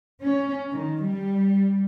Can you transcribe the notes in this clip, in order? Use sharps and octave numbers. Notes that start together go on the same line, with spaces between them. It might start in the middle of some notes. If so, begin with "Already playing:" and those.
C#4
D#3
G3